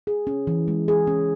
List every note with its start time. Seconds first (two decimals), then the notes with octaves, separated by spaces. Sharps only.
0.07 G#4
0.27 C#4
0.47 E3
0.68 G#3
0.88 G#4
1.07 C#4